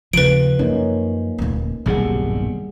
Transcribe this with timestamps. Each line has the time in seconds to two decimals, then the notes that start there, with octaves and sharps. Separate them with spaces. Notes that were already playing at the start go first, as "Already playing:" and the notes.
0.13 D#2 C#3 F3 B4 D7
0.59 F#2 A#3 C#4 D#4
1.38 D#1 D2
1.86 D#1 B1 G2 C3 G3 G#4 F#5